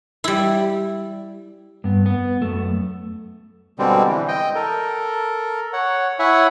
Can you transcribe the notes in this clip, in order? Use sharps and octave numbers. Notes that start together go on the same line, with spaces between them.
G3 E4
G2 B3
B3
F#2 A3
B2 D3 G3 G#3 C4
E3
D#5 G5
A4 A#4
C#5 F#5
E4 C#5 E5 F#5 G#5